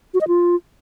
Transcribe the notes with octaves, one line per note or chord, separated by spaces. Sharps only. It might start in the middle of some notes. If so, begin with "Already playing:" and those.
F#4
D#5
F4